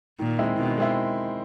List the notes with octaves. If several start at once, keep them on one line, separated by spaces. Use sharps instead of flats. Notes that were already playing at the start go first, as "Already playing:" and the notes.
A#2 D#3
G#3 C4 E4
B2 D#3
G#3 C4 E4